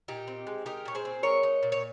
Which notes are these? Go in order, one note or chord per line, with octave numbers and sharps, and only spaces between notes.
A#2 D#4 G4
C4
G#3
D#4 G4 A#4
A#2 C#5
G#4 C5
C4
G#3 A#4 C#5
D#4
A#2
C#5